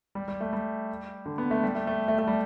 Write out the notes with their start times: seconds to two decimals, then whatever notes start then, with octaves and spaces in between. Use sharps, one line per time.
0.15 G3
0.28 G3
0.40 A3
0.53 G3
1.26 D3
1.38 B3
1.51 A3
1.63 G3
1.75 A3
1.87 A3
2.08 A3
2.19 A3
2.27 G3